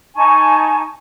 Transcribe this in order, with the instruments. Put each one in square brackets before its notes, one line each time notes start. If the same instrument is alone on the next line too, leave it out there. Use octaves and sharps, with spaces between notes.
[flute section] D#4 G#5 A5 C#6